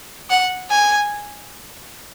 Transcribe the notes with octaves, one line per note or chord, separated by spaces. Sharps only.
F#5
G#5